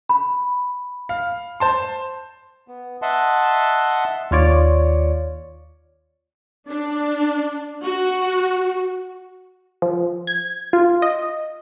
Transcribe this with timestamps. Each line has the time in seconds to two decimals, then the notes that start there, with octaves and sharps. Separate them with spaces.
0.09 B5
1.09 F5
1.60 C5 A5 C6
2.68 B3
3.02 D#5 E5 F#5 A5 C6
4.31 D#2 F4 C#5 D5
6.69 D4
7.84 F#4
9.82 F3
10.27 G#6
10.73 F4
11.02 D#5